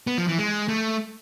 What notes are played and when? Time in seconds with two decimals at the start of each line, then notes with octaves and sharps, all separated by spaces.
0.07 B3
0.18 F3
0.28 E3
0.38 G#3
0.68 A3